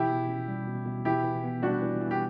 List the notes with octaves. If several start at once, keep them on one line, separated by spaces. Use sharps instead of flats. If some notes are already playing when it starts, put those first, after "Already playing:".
Already playing: B2 E3 E4 G4
B2
C#4
G3
B2
B2
E3 E4 G4
E3
B3
G3 D4 F#4
E3
E3
G4